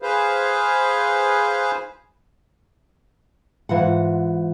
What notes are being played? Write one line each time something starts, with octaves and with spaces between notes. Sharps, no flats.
G#4 B4 C5 F5
G#2 E3 F4 F#5